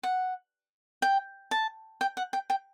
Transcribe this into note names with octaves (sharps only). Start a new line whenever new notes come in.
F#5
G5
A5
G5
F#5
G5
G5